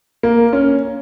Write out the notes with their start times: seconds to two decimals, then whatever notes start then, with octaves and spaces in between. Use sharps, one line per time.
0.23 A#3
0.53 C#4